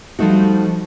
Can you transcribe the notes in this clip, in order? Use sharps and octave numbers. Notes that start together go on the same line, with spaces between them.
F3 G3 A3 D#4 F#4